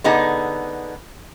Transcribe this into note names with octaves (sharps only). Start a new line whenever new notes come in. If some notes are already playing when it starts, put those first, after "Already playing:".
D3 B3 D#4 G#4